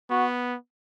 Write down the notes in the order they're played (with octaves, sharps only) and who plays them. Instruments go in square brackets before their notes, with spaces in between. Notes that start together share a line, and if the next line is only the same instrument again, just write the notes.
[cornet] B3 [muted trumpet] F#4